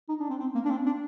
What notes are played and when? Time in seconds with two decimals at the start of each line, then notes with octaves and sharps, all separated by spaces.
0.09 D#4
0.20 D4
0.30 C4
0.40 C4
0.55 A#3
0.65 D4
0.70 C4
0.86 D4